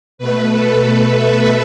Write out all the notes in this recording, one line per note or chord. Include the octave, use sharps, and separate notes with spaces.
B2 A3 B4
A4
B4
E5